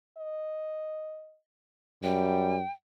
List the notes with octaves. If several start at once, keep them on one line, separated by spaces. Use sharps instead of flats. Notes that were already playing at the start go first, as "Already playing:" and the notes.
D#5
F#2 G3 G5